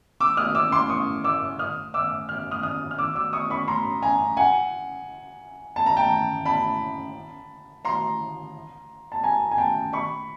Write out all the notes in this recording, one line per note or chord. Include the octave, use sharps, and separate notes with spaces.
D6 E6
D#6 F6
D6 E6
C6 D6
C#6 D#6
D6 E6
D#6 F6
D6 E6
F6
D#6 F6
D#6 F6
F6
D6 E6
D6 E6
C#6 D#6
B5 C#6
A#5 C6
G#5 A#5
F#5 G#5
A5
A#5
G5 A5
A5 B5
A#5 C6
A5
G#5 A#5
G#5
G5 A5
B5 C#6